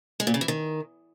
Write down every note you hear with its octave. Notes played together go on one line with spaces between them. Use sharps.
G#3
A#2
C#3
E3
D#3